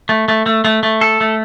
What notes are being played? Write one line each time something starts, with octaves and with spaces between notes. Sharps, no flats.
A3
A3
A3
A3
A3
A4
A3